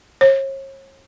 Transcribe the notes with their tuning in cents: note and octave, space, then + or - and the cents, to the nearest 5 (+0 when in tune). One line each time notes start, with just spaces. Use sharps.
C#5 -40